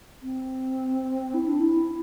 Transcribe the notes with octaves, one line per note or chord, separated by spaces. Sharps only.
C4
E4
D4
E4